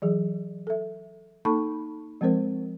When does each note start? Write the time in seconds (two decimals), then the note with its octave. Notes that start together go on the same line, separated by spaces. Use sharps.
0.02 E3 F#3 G#4
0.67 A4 E5
1.45 A#3 D#4 A4 A5 B5 C#6
2.21 F3 G#3 C4 A#4 C5